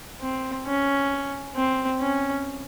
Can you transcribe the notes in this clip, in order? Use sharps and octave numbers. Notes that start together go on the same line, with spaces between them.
C4
C#4
C4
C#4